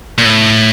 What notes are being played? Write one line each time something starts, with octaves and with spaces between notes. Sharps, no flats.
A#2
A2